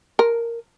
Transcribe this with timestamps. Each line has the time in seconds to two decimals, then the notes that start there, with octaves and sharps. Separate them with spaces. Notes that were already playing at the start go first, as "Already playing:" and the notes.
0.19 A#4